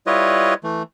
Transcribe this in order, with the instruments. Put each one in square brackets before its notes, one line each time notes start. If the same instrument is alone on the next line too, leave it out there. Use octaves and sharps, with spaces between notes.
[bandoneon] G3 E4 F4 B4 C#5 D#5
E3 A3